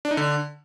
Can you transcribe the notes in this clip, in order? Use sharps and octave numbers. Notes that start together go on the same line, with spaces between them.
D4
D#4
D3